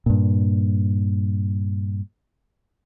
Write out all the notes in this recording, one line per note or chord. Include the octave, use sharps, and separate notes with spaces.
G2 A#2